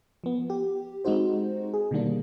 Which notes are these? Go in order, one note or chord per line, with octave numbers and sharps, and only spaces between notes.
F3 B3
G4
G#3 C4 D#4 F#4 C5
G#4
B2 D3 D#3 G3 A#3 D4